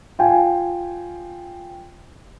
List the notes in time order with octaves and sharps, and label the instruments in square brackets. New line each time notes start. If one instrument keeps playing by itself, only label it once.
[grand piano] F4 G5 G#5